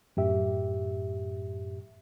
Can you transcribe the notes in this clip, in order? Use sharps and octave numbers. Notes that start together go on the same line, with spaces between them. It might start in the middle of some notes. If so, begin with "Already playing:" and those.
F#2 A2 G4 E5